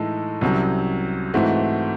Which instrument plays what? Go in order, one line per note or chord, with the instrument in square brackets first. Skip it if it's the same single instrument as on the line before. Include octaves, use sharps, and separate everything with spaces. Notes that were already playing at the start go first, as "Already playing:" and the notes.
Already playing: [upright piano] A2 E3 G#3 D#4 A4
C2 C3 F#3 C#4
G#2 E3 A3 C4 F#4